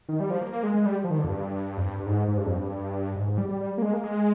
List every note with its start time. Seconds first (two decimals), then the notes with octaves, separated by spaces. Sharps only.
0.09 D#3
0.20 G3
0.30 F3
0.41 A#3
0.53 A#3
0.63 G#3
0.74 G#3
0.86 G3
1.04 F3
1.10 D#3
1.18 D3
1.24 F2
1.29 G2
1.77 F2
1.84 G2
2.00 G2
2.06 G#2
2.28 G#2
2.37 G2
2.46 F2
2.55 G2
3.16 G#2
3.28 G#2
3.38 G3
3.49 G3
3.61 G3
3.78 A#3
3.82 G#3
3.94 A#3
4.04 G#3